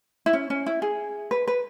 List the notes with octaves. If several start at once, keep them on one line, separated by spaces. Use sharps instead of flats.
E4
C#4
C#4
E4
G#4
B4
B4